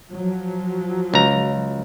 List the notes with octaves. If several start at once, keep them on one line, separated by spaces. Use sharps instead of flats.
F3 F#3
C#2 A#5